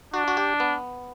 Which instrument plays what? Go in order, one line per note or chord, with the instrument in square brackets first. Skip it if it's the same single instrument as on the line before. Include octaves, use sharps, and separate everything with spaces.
[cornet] D4 [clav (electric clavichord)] F#4
[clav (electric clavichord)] F#4
G4
B3